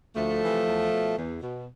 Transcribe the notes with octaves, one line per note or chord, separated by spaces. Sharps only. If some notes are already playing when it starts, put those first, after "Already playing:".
D2 F3 A3
C3 E3
E2
B2
E2
B2